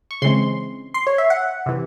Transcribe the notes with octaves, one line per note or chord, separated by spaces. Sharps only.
C#6
C#3 E3 G#3 C4 C6
C6
C#5
E5
F#5
C3 E3